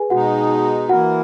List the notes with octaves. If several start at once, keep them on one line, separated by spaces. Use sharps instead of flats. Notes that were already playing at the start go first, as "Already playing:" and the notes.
Already playing: G#4 B4 G#5
B2 G#3 D#4 F#4 F#5
E3 A#3 E4 F#4 A#4 F#5